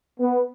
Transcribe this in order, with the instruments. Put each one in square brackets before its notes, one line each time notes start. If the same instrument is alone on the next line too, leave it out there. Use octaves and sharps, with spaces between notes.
[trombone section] B3